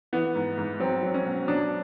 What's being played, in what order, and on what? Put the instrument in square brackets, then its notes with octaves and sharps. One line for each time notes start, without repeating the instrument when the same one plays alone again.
[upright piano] E3 B3
G#2
G#2
F#3 C4
F#3
C#4
B2
F#3 D4